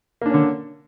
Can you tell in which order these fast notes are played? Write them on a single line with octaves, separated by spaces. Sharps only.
A#3 D4 C#4 D3